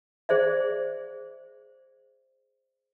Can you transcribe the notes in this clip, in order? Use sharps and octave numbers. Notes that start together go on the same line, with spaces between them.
G#4 C5 D5 E5